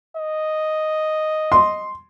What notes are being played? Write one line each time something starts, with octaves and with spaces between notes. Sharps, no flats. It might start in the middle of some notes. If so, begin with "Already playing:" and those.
D#5
C6